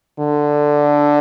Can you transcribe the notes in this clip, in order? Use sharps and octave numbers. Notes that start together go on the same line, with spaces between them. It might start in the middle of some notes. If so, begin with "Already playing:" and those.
D3